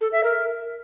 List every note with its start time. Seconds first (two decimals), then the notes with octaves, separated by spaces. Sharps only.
0.01 A4
0.12 E5
0.24 A#4